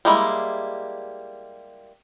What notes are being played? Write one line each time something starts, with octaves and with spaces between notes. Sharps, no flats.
G3 G#3 A#3 E4